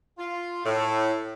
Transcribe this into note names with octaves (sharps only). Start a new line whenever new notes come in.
F4
A2